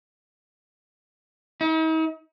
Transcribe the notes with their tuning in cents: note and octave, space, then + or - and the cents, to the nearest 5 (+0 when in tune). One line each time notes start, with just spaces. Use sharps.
D#4 +45